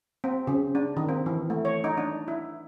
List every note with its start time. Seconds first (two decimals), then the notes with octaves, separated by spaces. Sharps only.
0.24 C4
0.47 C#3
0.75 D4
0.97 D#3
1.09 C4
1.26 E3
1.50 A3
1.65 C#5
1.84 D#4
1.97 D4
2.28 E4